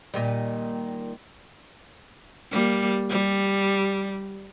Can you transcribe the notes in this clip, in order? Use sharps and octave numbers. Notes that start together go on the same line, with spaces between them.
A#2 D#3 G3
G3 A#3
G3